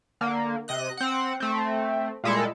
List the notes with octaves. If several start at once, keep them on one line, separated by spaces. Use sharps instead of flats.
D3 A#3
C3 D#5 F#6
C4 F#5
A3 C4
A#2 G3 G#3 E4 A4